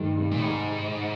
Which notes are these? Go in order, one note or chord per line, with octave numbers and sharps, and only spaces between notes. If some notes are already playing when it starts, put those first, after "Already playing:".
Already playing: G2 D#3 G3 A3
C3
A#2
A2
G#2 G3